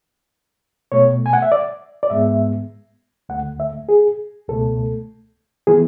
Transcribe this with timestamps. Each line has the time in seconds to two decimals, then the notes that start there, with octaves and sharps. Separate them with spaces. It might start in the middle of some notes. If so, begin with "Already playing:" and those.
0.92 B2 A3 C#5
1.26 G#5
1.33 F#5
1.42 E5
1.52 D5
2.03 D5
2.10 G#2 G#3 B3 E5
3.29 D2 D3 A3 F#5
3.60 E5
3.89 G#4
4.48 C#2 B2 A3 A4
5.67 E3 B3 G#4